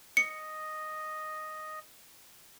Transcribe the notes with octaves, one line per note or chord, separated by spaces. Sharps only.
D#5 C#7